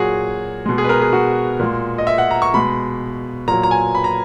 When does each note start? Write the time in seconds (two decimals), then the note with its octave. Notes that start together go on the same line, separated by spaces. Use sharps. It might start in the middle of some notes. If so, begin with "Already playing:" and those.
Already playing: A#2 F#3 F#4 G#4
0.66 B2 G#3
0.78 G#4
0.84 B4
0.89 A#4
1.01 G#4
1.13 F#4
1.60 A#2 G#3
1.98 D#5
2.07 E5
2.18 F#5
2.31 A#5
2.42 C#6
2.54 B2 G#3 B5
3.48 A#2 F#3 A#5
3.63 A#5
3.71 G#5
3.95 B5
4.04 A#5